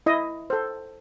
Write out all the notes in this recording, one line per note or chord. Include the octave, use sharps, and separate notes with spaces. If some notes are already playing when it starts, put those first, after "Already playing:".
E4 D#5
A4 C5